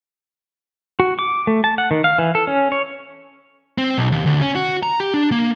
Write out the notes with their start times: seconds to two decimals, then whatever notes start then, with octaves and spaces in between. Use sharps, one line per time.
1.00 F#4
1.19 D6
1.47 A3
1.64 A5
1.78 F#5
1.91 D#3
2.04 F5
2.18 E3
2.35 A4
2.47 C#4
2.72 C#5
3.78 C4
3.98 B1
4.12 D#2
4.26 D2
4.41 C#4
4.55 F#4
4.83 A#5
5.00 G4
5.14 D4
5.32 A#3